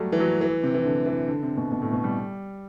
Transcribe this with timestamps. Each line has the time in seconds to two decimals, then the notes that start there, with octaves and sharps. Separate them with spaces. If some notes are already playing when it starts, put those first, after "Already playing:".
Already playing: F#3 G3 A3
0.12 E3
0.20 F#3
0.41 E3
0.63 C3
0.74 E3
0.85 D3
1.06 E3
1.28 D3
1.43 C3
1.57 B2
1.71 B2
1.82 A2
1.93 B2
2.04 G3